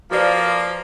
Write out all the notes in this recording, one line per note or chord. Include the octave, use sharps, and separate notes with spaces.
F3 A#3 F#4 B4 D5